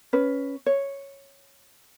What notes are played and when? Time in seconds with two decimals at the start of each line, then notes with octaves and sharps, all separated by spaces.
0.13 C#4 B4
0.66 C#5